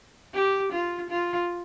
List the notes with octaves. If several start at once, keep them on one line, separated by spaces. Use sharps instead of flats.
G4
F4
F4